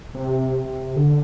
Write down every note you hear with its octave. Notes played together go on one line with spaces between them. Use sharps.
C3
D3